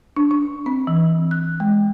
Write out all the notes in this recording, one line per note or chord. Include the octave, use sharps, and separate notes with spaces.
D4
D4
C4
E3
F#6
G#3